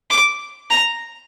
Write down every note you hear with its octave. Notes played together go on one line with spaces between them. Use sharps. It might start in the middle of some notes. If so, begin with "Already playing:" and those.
D6
A#5